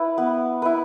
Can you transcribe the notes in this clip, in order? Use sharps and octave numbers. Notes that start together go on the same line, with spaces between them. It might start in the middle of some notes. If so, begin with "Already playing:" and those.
Already playing: E4 B4
B3
E4 B4